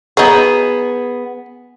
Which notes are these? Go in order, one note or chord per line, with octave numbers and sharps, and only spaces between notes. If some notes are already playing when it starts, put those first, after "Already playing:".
F#3 B3 D#4 G#4